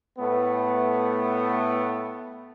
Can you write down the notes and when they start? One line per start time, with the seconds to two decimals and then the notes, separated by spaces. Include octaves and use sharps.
0.19 A2 A3 B3